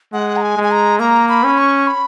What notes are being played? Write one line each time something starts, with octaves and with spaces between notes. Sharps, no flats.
G#3 F#5
A#5
G#5
G#3
G#5
A#5
A#3 A#5
B5
C#4
C#6
B5